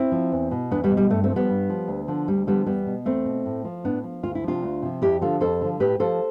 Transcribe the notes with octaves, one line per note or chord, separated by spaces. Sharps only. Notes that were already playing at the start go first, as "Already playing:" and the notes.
Already playing: C4 E4
F3
E2
B2
E2 B3 D4
G3 B3
B2
G3
G2 A3
A3 C4
F3
G3 B3
G2
F3
D2
D3 F3
D2 G3
D3 F3 G3 B3
E2 G3 B3
B2
E2 A3 C4
B2
A2
F3
A2 B3 D4
F3
D2 F4
E4
C3 F3 D4 F4
D2
C3 F3
F2 E4 G4
D3 F3 F4 A4
F2 A4 C5
D3 F3
A2 G4 B4
F3 A4 C5